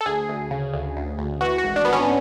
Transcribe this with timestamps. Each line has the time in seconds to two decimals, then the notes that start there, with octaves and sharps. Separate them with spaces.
0.01 A4
0.06 D2 G#4
0.29 D2
0.51 C#3
0.73 D2
0.96 D2
1.18 D2
1.41 E3 F#4
1.58 F#4
1.64 G#1
1.76 D4
1.85 G#1 B3
1.93 C#4